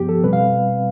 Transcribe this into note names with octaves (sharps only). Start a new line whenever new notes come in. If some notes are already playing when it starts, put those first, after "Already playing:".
Already playing: G2 F3 B3 G4
A4
B2 G3 C4 B4
F5